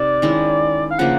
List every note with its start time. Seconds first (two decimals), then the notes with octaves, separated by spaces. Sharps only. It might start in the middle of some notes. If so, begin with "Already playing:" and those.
Already playing: C3 D#4 D5
0.22 D#3 G#3 C#4 E4
0.91 F5
0.99 C#3 F3 A#3 D4 F#5